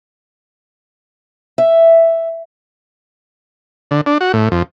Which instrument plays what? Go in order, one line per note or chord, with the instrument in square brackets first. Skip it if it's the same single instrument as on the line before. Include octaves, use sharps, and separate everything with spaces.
[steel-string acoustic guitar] E5
[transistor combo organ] D3
D4
F#4
A2
F2